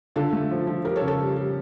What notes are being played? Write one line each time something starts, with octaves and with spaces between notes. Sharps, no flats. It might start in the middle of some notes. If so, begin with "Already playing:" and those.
D3 F4 A4
A3
F3
F3
G3 G4 A#4
A4 C#5
C#3
A4 C#5
G3
G3